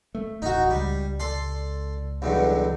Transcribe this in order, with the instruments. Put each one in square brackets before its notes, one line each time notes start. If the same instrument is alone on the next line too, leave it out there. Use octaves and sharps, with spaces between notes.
[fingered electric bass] A3
[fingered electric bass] D1 A1 [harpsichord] D#4 F#4
[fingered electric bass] C#2 [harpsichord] G3
[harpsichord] A4 D5 C6
B1 E2 G2